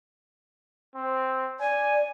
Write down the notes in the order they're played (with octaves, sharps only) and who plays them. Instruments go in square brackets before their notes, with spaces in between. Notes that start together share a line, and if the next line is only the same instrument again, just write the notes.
[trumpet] C4
[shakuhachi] D5 [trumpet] G#5